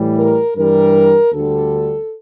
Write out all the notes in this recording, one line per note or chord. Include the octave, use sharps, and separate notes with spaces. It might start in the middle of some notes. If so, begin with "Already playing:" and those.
Already playing: A2 E3 G3
A#4
G2 E3 G3 A#4
D2 D3 G3 A4